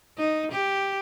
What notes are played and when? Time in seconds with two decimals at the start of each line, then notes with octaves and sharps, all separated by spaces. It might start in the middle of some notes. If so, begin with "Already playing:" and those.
0.18 D#4
0.52 G4